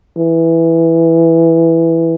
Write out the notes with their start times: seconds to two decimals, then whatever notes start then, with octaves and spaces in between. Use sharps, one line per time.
0.18 E3